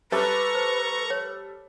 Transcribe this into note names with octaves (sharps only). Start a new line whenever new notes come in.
G3 A4 B4 A#5 C#6 D6
C5
C#5